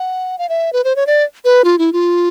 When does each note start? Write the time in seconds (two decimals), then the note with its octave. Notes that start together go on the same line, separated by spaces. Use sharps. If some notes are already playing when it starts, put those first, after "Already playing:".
Already playing: F#5
0.39 F5
0.49 E5
0.73 B4
0.84 C5
0.96 C#5
1.07 D5
1.45 B4
1.64 F4
1.78 E4
1.93 F4